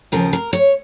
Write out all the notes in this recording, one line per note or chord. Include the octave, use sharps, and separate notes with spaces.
D#2 C#3 F3 A#4
A#4
C#5